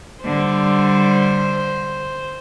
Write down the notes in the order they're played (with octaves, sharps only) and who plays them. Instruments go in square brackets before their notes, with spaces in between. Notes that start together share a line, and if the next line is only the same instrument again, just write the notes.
[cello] D3 G3 [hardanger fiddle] C5